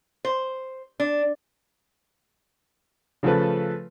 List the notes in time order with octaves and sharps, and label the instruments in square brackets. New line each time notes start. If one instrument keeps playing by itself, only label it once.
[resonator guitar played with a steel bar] C5
D4
[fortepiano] C#3 F3 A3 A4 B4